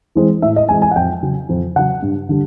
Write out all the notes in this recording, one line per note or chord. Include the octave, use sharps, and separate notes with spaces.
E3 G#3 C4
A2 E5
D#5
E3 G#3 C4 G#5
G#5
F#5
F2 G5
C#3 F#3
F2
C#3 F#3 F#5
G2
D3 G3